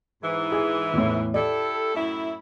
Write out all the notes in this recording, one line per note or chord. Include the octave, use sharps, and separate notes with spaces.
G#2 E3
G#4
E2 A2
E4 G4 A4 D5
F#2 A2 E4